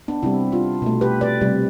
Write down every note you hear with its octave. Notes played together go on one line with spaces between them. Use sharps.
B3 D4
C3 G3 C4 E4
D4 F4
B2 A3
G4 B4
B4 D5
C3 G3